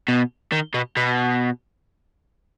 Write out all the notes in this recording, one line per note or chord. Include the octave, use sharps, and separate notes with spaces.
B2
D#3
B2
B2